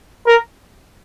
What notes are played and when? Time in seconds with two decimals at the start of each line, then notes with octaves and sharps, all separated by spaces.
0.27 A#4